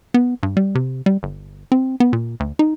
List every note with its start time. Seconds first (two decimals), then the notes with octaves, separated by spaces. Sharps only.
0.14 B3
0.43 G2
0.57 G3
0.75 C3
1.06 G3
1.23 G1
1.72 C4
2.00 B3
2.13 A#2
2.40 D2
2.59 D#4